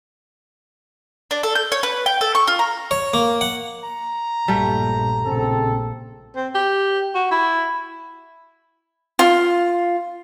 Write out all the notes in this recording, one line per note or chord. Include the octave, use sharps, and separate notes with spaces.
D4
A4
G6
C#5
B4
G5
A4
C#6
F4
A#5
C#5
A#3
F#5
A#5
A#1 G2 G3 A3
A#1 C#3 C4 A4
C4
G4
F#4
E4
F4